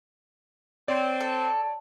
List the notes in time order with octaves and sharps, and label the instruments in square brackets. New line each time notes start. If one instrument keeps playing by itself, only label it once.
[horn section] C4 [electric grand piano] C#5 D5
[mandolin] A4